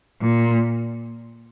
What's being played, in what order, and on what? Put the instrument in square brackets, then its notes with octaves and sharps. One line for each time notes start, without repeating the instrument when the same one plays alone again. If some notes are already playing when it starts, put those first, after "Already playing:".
[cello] A#2